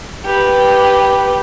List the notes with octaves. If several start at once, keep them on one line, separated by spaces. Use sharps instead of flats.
G4 B4